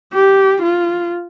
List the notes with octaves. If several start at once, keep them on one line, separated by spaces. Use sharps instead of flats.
G4
F4